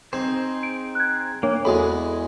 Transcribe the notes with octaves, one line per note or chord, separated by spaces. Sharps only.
C4 D#4 G#4 C5
D7
F#6 G#6
A#3 D4 C#5
E2 G#3 F#4 A4 B5 D#6